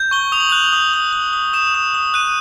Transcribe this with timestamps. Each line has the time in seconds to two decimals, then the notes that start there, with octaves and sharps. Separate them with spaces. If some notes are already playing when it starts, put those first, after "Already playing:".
Already playing: G6
0.11 C#6 G7
0.32 D#6 F7
0.40 F#7
0.50 F#6 F7
0.73 D#6
0.94 D#6
1.13 D#6
1.33 D#6
1.53 D#6 E7
1.74 D#6
1.94 D#6
2.14 F#6 D#7